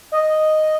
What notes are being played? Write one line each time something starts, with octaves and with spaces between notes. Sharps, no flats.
D#5